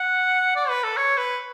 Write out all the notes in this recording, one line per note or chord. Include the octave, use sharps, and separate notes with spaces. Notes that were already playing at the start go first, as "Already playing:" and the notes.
Already playing: F#5
D5
B4
A4
C#5
B4